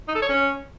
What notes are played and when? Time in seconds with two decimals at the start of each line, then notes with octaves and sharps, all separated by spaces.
0.08 D#4
0.15 A4
0.22 C#5
0.29 C#4